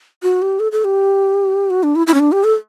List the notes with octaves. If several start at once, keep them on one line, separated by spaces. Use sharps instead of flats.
F#4
G4
A4
A4
G4
F#4
D4
E4
E4
C#4
D4
G4
A4